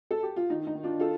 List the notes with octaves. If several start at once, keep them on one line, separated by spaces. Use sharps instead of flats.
A4
G4
F4
D#3 D#4
D#4
D#3
D4 F4
F4 A4